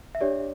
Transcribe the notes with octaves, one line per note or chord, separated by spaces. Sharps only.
E5
D4 G4 C#5 D5